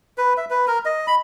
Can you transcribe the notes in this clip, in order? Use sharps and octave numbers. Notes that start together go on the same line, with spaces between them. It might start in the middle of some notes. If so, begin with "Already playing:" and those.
B4
E5
B4
A#4
D#5
B5